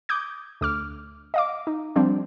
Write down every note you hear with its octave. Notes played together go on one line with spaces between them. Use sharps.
D6 D#6 G6 G#6
D2 D6 F6
D#5 F5 D6
D#4
F3 G3 C4 D4